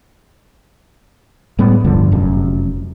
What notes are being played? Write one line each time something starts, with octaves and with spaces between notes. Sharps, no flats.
A2 G3 G#3 B3
D1 G2 D3 F3
F1 F#2